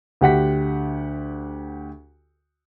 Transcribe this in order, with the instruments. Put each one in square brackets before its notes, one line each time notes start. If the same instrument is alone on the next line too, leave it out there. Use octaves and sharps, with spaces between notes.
[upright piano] D2 G4 F#5 B6